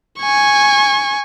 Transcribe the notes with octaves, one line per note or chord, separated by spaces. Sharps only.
G#5 C#6